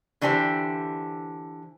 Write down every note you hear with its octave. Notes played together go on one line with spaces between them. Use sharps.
D3 E3 D4 G4 A4 C5